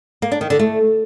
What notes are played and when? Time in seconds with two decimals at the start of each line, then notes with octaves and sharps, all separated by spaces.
0.22 A#3
0.32 D4
0.41 D#3
0.50 D3
0.59 A3